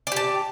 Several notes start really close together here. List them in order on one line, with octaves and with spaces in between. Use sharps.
D5 G4 A5